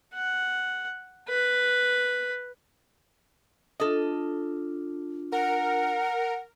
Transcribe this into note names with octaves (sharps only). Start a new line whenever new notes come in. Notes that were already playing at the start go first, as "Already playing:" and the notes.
F#5
B4
D4 F4 A4 D#5
A#4 F#5